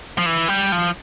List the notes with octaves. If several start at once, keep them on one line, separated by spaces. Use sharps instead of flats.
F3
E3
G3
F3